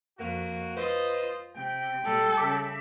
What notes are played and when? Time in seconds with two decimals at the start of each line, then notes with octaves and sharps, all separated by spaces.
0.19 F2 A#3 F#4
0.77 F4 B4 C5 D#5
1.56 C3 G5
2.06 A#2 G3 A4
2.38 C#3 E5 D6